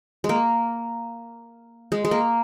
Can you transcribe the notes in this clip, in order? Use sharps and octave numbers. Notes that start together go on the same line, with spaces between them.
G#3
A#3
G#3
G#3
A#3